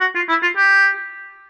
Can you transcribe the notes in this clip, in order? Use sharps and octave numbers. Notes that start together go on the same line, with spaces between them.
F#4
F4
E4
F4
G4